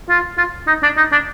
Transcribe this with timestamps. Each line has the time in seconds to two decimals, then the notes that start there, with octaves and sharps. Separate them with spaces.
0.09 F4
0.38 F4
0.67 D#4
0.83 D4
0.97 D#4
1.12 D4